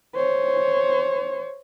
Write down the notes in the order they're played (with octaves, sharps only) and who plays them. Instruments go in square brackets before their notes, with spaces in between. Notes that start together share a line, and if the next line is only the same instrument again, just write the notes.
[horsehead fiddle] C5 C#5